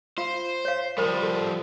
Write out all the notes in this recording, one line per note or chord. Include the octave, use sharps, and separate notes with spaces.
F4 C5 F5
C#5 F5
F3 G3 A#4 C5 B5
A4